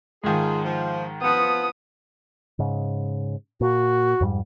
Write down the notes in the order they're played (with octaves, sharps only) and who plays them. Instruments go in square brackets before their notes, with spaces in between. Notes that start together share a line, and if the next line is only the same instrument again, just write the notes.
[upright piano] G#2 D#3 [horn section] F3 F4 G#4
[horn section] F3
[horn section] F3 B3 [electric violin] D#6
[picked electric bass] G#2 C#3
[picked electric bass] A#2 [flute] F#4
[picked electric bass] F2 G#2 G3